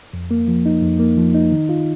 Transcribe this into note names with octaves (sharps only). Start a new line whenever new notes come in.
F2
A#3
F3
D#4
F2
A#3
F3
D#4
D#3
F4